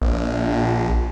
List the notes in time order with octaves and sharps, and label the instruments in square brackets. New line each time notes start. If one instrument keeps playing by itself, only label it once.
[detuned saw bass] A#1